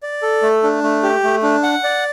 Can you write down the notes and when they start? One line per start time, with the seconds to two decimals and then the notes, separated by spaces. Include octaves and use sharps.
0.03 D5
0.22 A4
0.42 A3
0.63 D4
0.83 A3
1.03 G4
1.23 A3
1.43 D4
1.63 F#5
1.84 D5